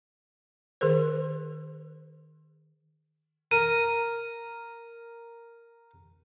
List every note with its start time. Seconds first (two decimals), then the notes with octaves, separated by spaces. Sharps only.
0.81 D#3 G#4 A#4 C5
3.51 A#4 D#7